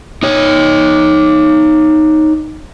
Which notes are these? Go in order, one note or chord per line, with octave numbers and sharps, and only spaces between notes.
D#4 C#5